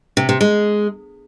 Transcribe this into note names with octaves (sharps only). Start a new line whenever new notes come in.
C3
C3
G#3